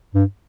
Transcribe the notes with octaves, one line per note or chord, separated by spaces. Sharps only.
G2